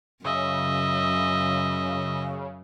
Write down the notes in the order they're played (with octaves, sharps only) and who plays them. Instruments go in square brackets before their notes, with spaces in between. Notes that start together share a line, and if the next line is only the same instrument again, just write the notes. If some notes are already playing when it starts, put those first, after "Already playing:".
[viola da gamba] F#2 [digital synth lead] C#3 [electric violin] D#5 E5